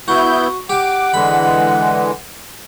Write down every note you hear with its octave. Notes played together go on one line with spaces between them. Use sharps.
B3 E4 F#4 G6
G4 F#5 D6
D3 E3 G#3 B5